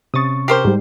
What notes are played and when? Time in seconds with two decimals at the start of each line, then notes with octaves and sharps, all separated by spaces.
0.14 C3 C#4 C#6 D#6 A6
0.48 G4 A#4 C5 C7
0.65 G#2 G3